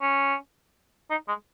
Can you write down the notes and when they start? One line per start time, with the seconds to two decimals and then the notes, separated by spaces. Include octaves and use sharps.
0.02 C#4
1.10 D#4
1.28 G#3